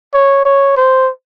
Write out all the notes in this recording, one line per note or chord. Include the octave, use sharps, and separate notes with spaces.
C#5
C#5
C5